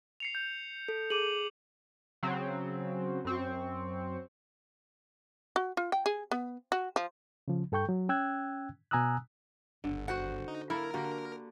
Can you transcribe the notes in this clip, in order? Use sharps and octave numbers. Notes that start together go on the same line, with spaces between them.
C7 C#7 F7
G6
A4
G#4 D6 D#7 F#7
C#3 F#3 C4
F#2 C4 C#6
F#4
F4
G5
G#4
B3
F#4
F3
C#3 F3
G2 A4 G5 C#6 G6
F#3
C#4 G5 E6 F#6 G#6
B2 G#5 A#5 D#6 E6 F#6
G1 D3
F#4 C5 F#5
D#4
A#3 E4 A4 A#4
D3 A#3 F#4 G4